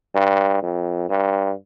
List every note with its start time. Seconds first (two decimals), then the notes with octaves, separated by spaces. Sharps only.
0.15 G2
0.62 F2
1.09 G2